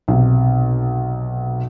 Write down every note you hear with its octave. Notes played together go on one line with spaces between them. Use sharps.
B1 C3